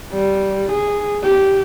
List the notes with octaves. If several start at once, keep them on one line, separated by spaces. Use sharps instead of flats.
G3
G#4
G4